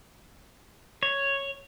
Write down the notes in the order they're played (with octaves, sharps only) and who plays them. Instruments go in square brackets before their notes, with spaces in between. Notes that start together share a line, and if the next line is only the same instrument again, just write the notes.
[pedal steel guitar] C#5